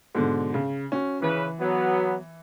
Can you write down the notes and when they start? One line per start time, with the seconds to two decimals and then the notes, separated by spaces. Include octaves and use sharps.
0.15 G#2 B2 D3
0.54 C#3
0.92 C#4 F#4
1.22 C#3 E3 B4
1.60 F#3 B3